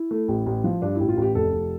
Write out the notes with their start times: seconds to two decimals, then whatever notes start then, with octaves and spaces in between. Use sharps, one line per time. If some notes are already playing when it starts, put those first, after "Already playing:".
Already playing: E4
0.11 A3
0.28 A1
0.46 A1
0.64 F3
0.82 G2 D4
0.95 E4
1.00 A1
1.09 F4
1.17 A1 G4
1.35 F1 A4
1.53 F1